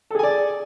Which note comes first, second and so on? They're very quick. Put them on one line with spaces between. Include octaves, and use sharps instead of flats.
A4 G#4 G#5 D5